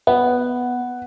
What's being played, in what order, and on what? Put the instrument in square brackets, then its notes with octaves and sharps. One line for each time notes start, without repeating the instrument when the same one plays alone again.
[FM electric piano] B3 [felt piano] F#5